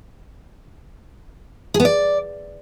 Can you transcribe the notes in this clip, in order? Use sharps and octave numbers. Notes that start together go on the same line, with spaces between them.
G#4
B3
D5